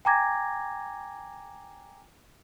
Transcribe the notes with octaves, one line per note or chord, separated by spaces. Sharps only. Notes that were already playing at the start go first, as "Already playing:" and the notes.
G5 G#5 A#5 D6 G#6 A#6